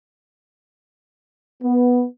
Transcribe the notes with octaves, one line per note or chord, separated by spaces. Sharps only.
B3